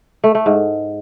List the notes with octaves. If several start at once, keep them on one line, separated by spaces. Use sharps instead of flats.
A3
A3
G#2